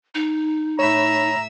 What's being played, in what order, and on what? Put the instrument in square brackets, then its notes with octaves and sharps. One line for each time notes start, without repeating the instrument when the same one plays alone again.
[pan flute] D#4
[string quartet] A2 E5 E6 [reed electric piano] C#5 B5 [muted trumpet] A#5